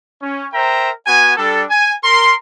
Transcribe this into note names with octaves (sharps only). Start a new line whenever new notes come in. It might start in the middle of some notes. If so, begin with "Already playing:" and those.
C#4
A#4 C5 E5 G5 A#5
B3 F#4 G#5
G3 D4 A4
G#5
A#4 C6